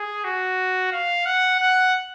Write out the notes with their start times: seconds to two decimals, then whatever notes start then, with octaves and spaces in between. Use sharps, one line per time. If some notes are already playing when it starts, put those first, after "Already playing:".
Already playing: G#4
0.24 F#4
0.92 F5
1.25 F#5
1.60 F#5